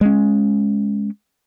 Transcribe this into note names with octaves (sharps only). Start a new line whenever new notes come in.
G#3 C#4